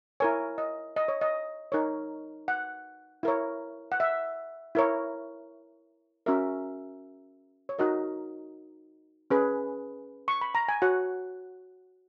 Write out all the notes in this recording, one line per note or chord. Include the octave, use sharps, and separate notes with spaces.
E4 A#4 C#5 G#5
D#5
D#5
C#5
D#5
D#4 A#4 C#5
F#5
E4 A#4 C#5
F#5
E5
E4 A#4 C#5
C#4 F#4 A#4 E5
C#5
D#4 F#4 A#4 D#5
C#4 G#4 B4
C#6
B5
A#5
G#5
F#4 C#5 F#5